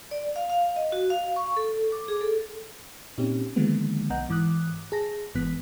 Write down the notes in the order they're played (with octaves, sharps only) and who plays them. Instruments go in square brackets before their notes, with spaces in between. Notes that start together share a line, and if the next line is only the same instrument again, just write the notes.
[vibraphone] D5
F5
F5
D#5
F#4
F5
C#6
A4
D6
G#4
A4
[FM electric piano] A#2 C4 C#4 D#4 G4
D3 D#3 F3 G#3 A#3 B3
B1 B3 D#5 F#5 A#5 G6
G#2 E3 D6 D#6 F#6
G#4 A5 A#6
G1 G#2 E3 B3 F#6 B6